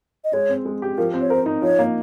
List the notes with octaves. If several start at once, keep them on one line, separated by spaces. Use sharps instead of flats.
D#5
G#3 C#5
C4
G#3
G4
F3 A#4
C4
C#5
A#4 C5
D#4
F3 C#5
A#3